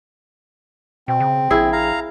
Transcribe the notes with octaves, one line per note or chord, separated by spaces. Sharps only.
B2 C4
C#3
A#1 E4 G#4
F5 A#5